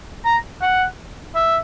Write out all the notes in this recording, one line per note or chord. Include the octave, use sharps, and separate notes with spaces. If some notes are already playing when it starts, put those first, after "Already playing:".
A#5
F#5
E5